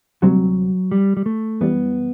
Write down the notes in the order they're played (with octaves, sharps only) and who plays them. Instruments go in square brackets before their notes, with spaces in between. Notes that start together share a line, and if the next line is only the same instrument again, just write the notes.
[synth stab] D2 C3 G3 C4 F#4 [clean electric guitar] F#3
[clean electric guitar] G3
G3
A3
[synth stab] F#2 E3 G3 [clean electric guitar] B3